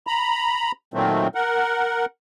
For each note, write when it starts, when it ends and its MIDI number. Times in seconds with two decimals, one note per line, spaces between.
0.07 0.72 82
0.07 0.72 83
0.94 1.28 46
0.94 1.28 51
0.94 1.28 54
0.94 1.28 57
0.94 1.28 60
1.35 2.06 70
1.35 2.06 78